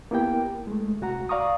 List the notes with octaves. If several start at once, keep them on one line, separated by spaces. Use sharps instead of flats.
A#3 B3 E4 G4 A#4 G5
G#3 A3
C2 F#4 F#5 A#5
D5 F5 A#5 C#6 D#6